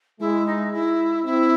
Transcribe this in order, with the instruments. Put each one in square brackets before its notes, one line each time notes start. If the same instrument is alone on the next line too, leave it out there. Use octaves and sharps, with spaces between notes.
[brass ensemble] G#3 [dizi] E4
[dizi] D#4
E4
[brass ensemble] C4 [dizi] E4